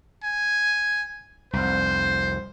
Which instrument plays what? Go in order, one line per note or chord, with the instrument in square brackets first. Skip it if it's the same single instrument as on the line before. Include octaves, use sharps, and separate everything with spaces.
[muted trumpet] G#5
[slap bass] C2 F2 [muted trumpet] C5